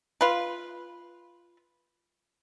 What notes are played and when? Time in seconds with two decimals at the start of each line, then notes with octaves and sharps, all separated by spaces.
0.21 F4 B4